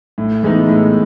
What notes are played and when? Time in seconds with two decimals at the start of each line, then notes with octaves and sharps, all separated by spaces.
0.18 A2
0.43 E3 G#3 B3 D#4
0.68 A2